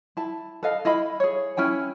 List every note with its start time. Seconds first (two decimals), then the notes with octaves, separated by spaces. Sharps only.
0.17 E4 A5
0.63 A4 B4 D#5 F5
0.85 E4 D#5 F5 B5
1.20 G#4 C#5
1.57 C#4 E4 G5 G#5